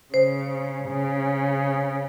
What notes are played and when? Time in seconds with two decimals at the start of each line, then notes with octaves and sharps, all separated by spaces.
0.14 C#3 C5
0.89 C#3